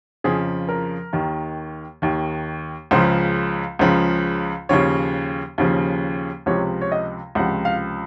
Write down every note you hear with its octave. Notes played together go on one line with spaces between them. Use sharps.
F2 C#3 F3 G#4
A#4
D#2 D#3
D#2 D#3
C#2 C#3 F3 C5
C#2 C#3 F3
D#2 C#3 F3 C#5
D#2 C#3 F3
C#2 C3 F3 C#5
C#5
D#5
C#2 C3 F3 F#5
F5